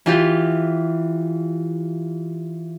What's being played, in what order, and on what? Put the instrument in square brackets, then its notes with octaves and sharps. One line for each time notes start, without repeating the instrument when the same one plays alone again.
[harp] E3 F4 G4